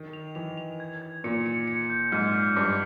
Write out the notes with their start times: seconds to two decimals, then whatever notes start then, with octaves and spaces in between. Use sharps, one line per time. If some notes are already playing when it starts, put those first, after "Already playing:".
Already playing: D#3
0.13 F7
0.35 E3 F7
0.58 F7
0.80 G#6
1.02 G#6
1.24 A#2 C#7
1.46 C#7
1.68 C#7
1.90 G6
2.12 G#2 F6
2.34 F6
2.56 G2 D6